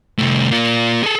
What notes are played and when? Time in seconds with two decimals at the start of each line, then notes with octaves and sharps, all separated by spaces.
0.19 C2 A3
0.51 A#3 F4
1.03 G#4 A4